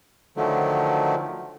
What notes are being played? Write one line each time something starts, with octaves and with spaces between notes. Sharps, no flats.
D3 D#3 F3 F#3 A3